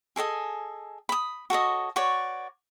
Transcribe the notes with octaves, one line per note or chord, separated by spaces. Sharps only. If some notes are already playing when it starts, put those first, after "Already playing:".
G#4 A4 D#5 G#5
B5 D#6
F#4 A4 C#5 D#5
F#4 B4 C#5 D5